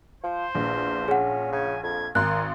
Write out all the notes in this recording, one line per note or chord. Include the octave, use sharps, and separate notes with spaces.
F3 C5
A#1 E2
C#4 G#4 F#5
C#3 G#5
F2 G#6
G#1 A#4 G#5 C6 F#6